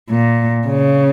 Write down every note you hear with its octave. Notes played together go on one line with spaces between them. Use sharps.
A#2
C#3